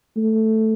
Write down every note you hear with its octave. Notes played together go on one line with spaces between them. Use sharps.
A3